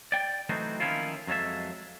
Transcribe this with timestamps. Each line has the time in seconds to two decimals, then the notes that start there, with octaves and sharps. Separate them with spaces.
0.12 D5 G5
0.49 E3 F#3 A3 C4 D#4 F#4
0.80 D#3 F3 A#3 C#4 E4 F4
1.27 F2 F#3 G#3 A4 E5